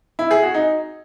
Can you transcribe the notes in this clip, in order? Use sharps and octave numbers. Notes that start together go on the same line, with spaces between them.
E4
G#4
F#4
D#4